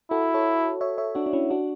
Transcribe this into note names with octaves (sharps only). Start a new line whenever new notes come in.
E4 F#4 A4
A4 C#5
C#5 E5
C#5 E5
D4 F#4
D4
C#4 E4
D4 F#4